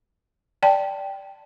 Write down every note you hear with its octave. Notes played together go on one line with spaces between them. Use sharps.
D5 G5 A5